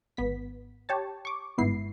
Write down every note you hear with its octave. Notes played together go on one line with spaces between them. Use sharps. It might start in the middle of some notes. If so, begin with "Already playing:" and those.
G#1 B3 B6
G4 C#5 A5
C#6 D6
G1 G#2 B3 E4 C7